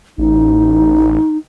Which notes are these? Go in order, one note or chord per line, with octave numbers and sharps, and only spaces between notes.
A1 D#4